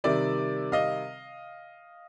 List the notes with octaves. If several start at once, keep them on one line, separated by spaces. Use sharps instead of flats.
C3 D#3 G3 D5 E5
D#5 F5